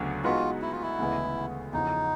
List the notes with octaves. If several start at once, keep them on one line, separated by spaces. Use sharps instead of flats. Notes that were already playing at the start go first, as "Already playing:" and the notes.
Already playing: D2 C#3 F#3 B3 D4
G#3 B3 D#4 F4 F#4 B4
E4
F4
E4
D2 C#3 E3 G#3 B3
E2 C#3 F3 D#4